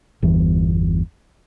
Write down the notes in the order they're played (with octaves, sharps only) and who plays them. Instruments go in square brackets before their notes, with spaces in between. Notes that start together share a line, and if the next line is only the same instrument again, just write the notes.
[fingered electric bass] G1 E2 E3